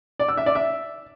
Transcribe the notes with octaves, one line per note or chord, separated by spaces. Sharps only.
D5
E6
E5
D5
E5